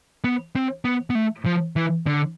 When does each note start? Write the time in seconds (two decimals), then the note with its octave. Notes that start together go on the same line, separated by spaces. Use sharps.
0.24 B3
0.56 C4
0.85 B3
1.10 B3
1.15 A3
1.46 F3
1.76 E3
2.07 D3